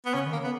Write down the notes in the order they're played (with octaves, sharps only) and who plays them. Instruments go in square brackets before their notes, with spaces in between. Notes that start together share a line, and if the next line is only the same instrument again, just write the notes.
[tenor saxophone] B3
[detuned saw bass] C#3 [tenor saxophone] C#4
[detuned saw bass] D#3
[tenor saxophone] A#3
[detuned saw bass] C#3
[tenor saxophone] B3